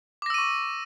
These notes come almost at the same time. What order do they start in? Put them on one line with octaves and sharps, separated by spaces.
D6 A#6 E6 D#7 C#6